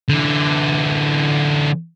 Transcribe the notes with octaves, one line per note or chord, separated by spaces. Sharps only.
D3 E3